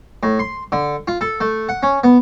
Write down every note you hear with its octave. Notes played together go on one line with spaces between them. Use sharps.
A2
C6
D3
F4
A4
A3
F#5
C#4
B3